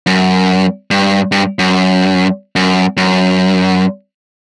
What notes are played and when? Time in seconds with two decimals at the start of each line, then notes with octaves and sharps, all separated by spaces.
0.07 F#2
0.91 G2
1.32 G2
1.59 F#2
2.56 F#2
2.97 F#2